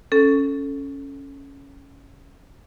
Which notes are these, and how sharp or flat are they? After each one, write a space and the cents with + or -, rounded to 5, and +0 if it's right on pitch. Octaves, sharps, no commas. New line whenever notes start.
C#4 +0 A4 +0